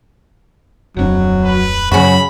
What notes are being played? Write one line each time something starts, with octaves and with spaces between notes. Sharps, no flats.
D1 F2 F#3 D4
B4
F#2 C#3 F#3 C#4 F#4 B5